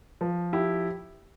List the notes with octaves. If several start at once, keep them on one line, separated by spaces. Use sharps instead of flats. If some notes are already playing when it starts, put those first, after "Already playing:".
F3
E4 G4